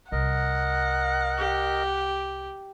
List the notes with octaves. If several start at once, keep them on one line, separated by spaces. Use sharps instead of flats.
C2 A#4 D#5 F#5
G4